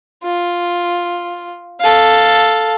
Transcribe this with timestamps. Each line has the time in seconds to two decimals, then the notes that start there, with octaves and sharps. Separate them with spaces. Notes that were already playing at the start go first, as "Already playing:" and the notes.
0.23 F4
1.80 A4 F5